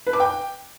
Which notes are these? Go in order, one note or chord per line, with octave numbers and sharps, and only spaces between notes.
B4
D6
G5